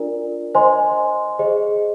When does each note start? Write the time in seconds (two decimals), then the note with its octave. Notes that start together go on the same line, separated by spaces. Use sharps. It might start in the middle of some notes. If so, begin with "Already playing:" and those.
Already playing: D4 F4 A#4 D5
0.55 C5 D#5 G#5 C6
1.39 G#4 C5 D#5